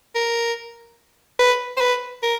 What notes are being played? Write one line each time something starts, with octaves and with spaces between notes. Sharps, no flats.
A#4
B4
C5
B4
A#4